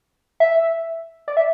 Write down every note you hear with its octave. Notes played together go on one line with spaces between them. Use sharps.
E5
D5
E5